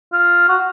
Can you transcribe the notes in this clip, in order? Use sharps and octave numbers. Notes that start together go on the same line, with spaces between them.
F4
F#4